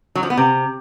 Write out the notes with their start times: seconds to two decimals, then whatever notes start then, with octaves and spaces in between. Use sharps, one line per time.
0.15 F#3
0.23 F3
0.30 B3
0.37 C3